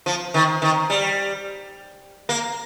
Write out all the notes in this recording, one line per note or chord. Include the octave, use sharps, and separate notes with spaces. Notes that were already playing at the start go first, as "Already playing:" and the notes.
F3
D#3
D#3
G3
A#3